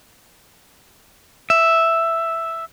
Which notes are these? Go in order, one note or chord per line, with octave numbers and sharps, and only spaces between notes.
E5